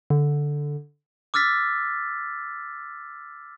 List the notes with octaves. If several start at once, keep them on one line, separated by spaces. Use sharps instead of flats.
D3
D6 E6 F6 A6 B6